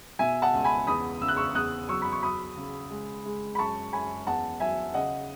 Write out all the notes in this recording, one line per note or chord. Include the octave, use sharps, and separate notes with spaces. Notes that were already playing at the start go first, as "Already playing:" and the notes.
B2 E5 G#5
F#5 A5
C#2
G#5 B5
E2 B5 D#6
C#3 E6
F#6
C#6 E6
E2 D#6 F#6
F#3 C#6 E6
B5
C#6
F#3 B5 D#6
C#3
G#3
G#3
B5
F#2 A5 C#6
F#2 G#5 B5
E2 F#5 A5
F#3 E5 G#5
C#3 D#5 F#5